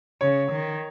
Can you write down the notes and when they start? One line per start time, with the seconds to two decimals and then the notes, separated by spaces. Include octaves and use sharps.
0.21 C#3 C#5
0.51 D#3